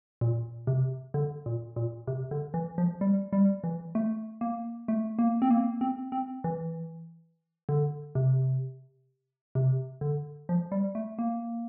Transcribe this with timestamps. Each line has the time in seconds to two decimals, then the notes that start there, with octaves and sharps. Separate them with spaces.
0.21 A#2
0.67 C3
1.14 D3
1.46 A#2
1.76 A#2
2.07 C3
2.31 D3
2.54 E3
2.78 F3
3.01 G3
3.33 G3
3.64 E3
3.95 A3
4.41 A#3
4.88 A3
5.19 A#3
5.42 C4
5.51 A#3
5.81 C4
6.12 C4
6.44 E3
7.69 D3
8.15 C3
9.55 C3
10.01 D3
10.49 F3
10.72 G3
10.95 A3
11.19 A#3